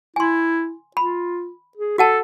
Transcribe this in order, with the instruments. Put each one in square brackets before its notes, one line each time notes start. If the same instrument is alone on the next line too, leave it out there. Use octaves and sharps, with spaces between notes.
[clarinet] E4 [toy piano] G#5 C6
[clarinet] F4 [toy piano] B5
[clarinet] G#4
[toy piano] F#4 F#5 A5 [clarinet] A4